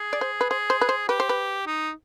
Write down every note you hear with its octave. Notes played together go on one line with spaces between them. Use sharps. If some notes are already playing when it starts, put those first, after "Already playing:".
Already playing: G#4
D5
C5
B4
G#4 C5
C5
B4
C5
G4 B4
C5
B4
D#4